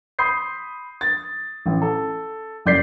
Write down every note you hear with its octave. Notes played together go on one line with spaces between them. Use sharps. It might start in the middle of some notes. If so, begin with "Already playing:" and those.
B5 C6 D#6 G6 C7
A6
A1
A4
F#1 F#2 D5 G6 B6 C7